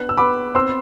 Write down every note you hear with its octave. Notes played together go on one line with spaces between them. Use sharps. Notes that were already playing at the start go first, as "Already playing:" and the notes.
Already playing: B3 D4 F#6
E6
B3 B5 D6
C4 C6 E6